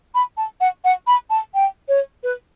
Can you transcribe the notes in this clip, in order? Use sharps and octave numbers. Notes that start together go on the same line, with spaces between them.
B5
A5
F#5
F#5
B5
A5
G5
C#5
B4